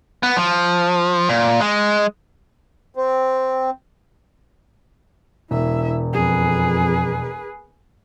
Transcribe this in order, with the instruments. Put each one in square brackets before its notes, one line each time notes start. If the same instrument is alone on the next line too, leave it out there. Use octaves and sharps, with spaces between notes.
[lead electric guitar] B3
F3
A#2
G#3
[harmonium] C4
[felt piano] E1 [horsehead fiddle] E4 E5
[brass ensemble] F2 [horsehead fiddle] G#4 B4